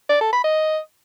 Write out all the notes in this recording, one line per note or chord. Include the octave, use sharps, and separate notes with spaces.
D5
A4
B5
D#5